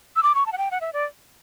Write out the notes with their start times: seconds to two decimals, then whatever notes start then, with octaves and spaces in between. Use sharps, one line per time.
0.16 E6
0.23 D6
0.35 C#6
0.46 A5
0.52 F#5
0.58 G5
0.71 F#5
0.81 E5
0.93 D5